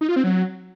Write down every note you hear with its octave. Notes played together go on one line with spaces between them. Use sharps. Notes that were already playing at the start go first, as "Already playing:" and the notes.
D#4
F4
C4
F#3